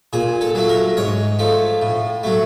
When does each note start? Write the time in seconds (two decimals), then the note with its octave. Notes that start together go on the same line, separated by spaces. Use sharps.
0.13 A#2 G#4
0.41 A4
0.55 F#3 A3
0.69 A#4
0.97 G#2 C#5
1.39 F3 A3
1.82 A2
2.23 F#3 A3